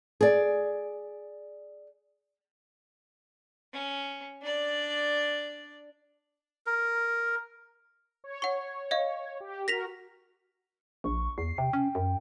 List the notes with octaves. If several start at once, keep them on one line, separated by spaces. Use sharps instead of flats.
G#4 D5
C#4
D4 D5
A#4
C#5
F#5 C#6
D#5 F5
G4
F#4 A#4 A#6 B6 F7
A#1 C#6
E2 C7
C3 G5
C#4
F#2